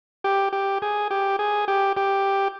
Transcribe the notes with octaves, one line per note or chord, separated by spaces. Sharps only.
G4
G4
G#4
G4
G#4
G4
G4